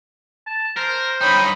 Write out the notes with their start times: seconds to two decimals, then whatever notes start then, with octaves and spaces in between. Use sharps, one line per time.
0.47 A5
0.77 A#4 C5
1.21 G2 D#4 C#5 G5 B5